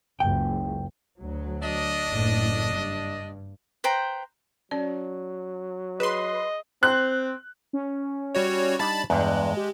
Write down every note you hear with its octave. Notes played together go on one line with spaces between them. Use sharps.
F#1 C#2 G5
D2 F#3
D4 D#5
F#1 A2
G2
B4 C5 G5 A#5
F#3 C#4 D5
G#4 B4 D#5 C6
C4 F#6
C#4
G3 F#4 C#5
G3 D4 D#4 A5 B5 A6
E2 G2 G#3 F#6
G4